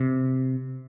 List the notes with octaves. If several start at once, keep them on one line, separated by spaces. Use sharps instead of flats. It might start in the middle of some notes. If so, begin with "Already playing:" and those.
Already playing: C3